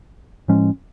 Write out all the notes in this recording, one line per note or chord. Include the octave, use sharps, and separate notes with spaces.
A2 F3 G#3 C#4